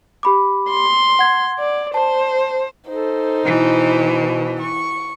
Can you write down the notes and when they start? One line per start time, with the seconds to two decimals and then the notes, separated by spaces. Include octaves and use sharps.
0.23 G4 B5 D6
0.69 C6
1.19 F#5 G#6
1.59 D5
1.94 C5 A5
2.88 D#4 A4 C5
3.45 B2 E3
4.61 C#6